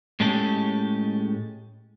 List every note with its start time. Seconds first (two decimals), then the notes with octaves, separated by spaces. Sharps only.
0.20 A2 G#3 C#4 G4 A4